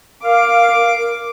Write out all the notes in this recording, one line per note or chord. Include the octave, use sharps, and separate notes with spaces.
A#4 F5 D6